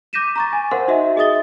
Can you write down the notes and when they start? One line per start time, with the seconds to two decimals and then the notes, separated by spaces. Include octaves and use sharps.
0.13 D6 G6 A#6 B6 D#7 E7
0.36 A#5 C#6 A6
0.53 G#5
0.71 A#4 C5 F5 F#5 C6
0.88 D#4 F#4 D#5 E5
1.16 G#4 D#5 E5 D#6 A6 G7